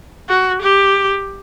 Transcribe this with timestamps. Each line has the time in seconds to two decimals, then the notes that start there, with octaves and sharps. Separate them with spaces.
0.29 F#4
0.62 G4